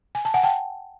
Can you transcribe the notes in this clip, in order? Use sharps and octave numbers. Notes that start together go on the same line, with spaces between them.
G#5
A5
F#5 G#5
G5 A5